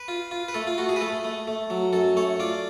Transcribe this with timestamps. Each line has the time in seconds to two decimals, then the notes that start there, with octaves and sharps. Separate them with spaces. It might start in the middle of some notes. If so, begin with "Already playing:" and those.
Already playing: B4
0.08 F4
0.31 F4
0.48 B4
0.54 A3 A4
0.67 F4
0.78 A3 F#4
0.89 G#4
0.96 B4
1.01 A3 A4
1.24 A3
1.48 A3
1.70 F#3
1.93 F#2 A4
2.17 A3 C#5
2.40 F4 D5